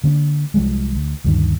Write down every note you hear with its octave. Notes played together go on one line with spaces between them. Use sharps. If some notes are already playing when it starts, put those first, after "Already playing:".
D3 A#3 C4 D4
C2 F3 G3 G#3
D2
D2 G2 D3 D#3